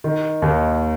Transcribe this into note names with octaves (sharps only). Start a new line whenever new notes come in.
D#3
D#2